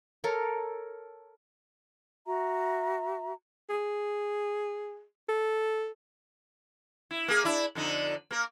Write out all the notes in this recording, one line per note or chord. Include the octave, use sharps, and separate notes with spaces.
A4 A#4 C#5
F#4 E5 A#5
G#4
A4
E4
A#3 G#4
D4 E4
F2 D3 D#4
A#3 A#4